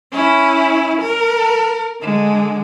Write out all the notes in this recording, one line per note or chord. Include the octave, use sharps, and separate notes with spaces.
C#4 E4
A#4
D3 G#3